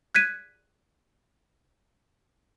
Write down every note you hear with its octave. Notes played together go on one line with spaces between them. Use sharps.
F#6 G#6 B6 D#7